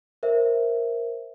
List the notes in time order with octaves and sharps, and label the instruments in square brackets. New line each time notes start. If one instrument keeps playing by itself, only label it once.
[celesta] A#4 C5 E5